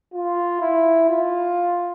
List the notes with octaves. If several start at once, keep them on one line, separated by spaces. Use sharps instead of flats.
F4
E4
F4